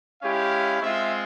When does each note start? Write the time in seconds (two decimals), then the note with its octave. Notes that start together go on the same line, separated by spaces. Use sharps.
0.22 G#3 C#4 E4 G4 F5
0.81 G#3 C4 F4 E5